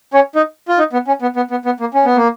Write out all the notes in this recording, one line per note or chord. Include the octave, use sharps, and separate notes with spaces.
C#4 C#5
D#4
F4
D#4
B3
C#4
B3
B3
B3
B3
A#3
C#4
B3
A#3